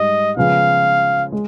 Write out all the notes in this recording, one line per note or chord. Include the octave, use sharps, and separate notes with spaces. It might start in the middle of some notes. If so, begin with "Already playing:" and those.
Already playing: G#2 G3 D#5
C#3 F3 G#3 B3 F5
G#3